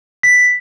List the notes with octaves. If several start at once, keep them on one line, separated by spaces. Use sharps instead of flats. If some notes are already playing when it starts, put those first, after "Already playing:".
B6